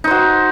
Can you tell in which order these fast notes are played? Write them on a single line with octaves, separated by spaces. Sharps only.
D#4 C5 F#4